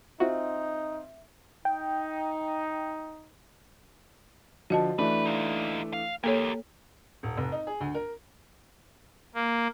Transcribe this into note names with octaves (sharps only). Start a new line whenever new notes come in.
C4 D#4 F4 F#4 E5
D#4 G5
D3 F3 F#4 D#5 A5
E3 A3 D4 B4
D#4 F4
F5
A#3 G4 A4 A#4 C#5
D#1
F1
D#4
G#4
D2
A#4
A#3